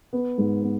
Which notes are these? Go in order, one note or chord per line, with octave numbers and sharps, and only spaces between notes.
B3
G#2
B3